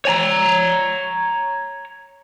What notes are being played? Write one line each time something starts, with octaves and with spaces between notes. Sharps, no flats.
C#5 G#5 A#5